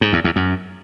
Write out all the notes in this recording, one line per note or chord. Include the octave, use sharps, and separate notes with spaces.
G#2
E2
E2
F#2